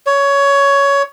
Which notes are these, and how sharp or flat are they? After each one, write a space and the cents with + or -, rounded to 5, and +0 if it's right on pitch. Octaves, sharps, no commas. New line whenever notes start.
C#5 +15